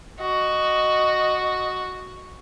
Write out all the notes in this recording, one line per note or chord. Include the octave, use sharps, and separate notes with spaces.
F#4 D#5